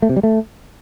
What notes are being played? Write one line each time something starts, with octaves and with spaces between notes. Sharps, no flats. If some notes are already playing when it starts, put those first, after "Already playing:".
A3
C3
G3
A3